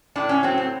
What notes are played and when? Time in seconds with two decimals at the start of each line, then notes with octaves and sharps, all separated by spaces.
0.16 A2 D4
0.29 C#4
0.43 F#3 C4
0.58 C4